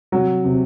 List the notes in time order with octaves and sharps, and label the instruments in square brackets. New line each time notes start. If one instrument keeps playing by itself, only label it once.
[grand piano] C3 [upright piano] F#3
[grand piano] C3